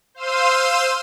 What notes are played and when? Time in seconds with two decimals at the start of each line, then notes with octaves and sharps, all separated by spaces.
0.14 C5 F5 C6 E6 D#7